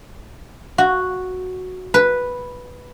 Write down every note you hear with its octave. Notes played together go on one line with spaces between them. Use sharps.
F#4
B4